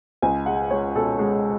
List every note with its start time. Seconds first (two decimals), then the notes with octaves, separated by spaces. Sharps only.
0.22 C#2 G#5
0.46 G#3 F#5
0.71 G#3 C#5
0.95 B2 A4
1.19 G#3